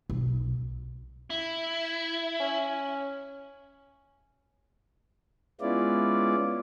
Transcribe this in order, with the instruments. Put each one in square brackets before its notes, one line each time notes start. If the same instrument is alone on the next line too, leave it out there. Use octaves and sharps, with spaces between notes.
[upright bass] B1
[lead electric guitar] E4
[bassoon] C#4
[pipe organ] G#3 B3 C#4 E4 F4 D5